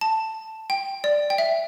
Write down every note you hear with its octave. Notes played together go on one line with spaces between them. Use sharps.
A5
G5
D5
G5
E5